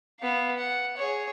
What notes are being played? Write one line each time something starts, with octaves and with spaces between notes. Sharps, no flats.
B3 F5
F#5
G#4 C#5